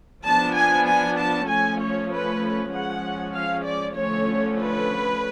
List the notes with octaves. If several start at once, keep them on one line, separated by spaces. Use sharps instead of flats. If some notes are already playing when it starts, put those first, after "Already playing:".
F3 B3 D4 A5
G#5
G#5
A5
F3 A3 C#4 G#5
C#5
B4
F3 G#3 C#4 F#5
F5
D5
D3 F3 A3 C#4 C#5
B4